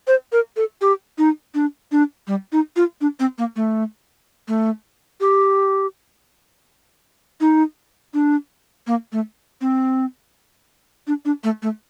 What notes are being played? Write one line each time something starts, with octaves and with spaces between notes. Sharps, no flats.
C5
A#4
A4
G4
D#4
D4
D4
G3
D#4
F4
D4
C4
A#3
A3
A3
G4
D#4
D4
A#3
A3
C4
D4
D4
A3
A3